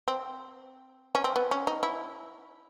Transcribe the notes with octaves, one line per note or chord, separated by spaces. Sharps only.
C4
C#4
C4
B3
C#4
D#4
E4